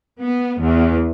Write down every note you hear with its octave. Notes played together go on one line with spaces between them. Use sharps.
B3
E2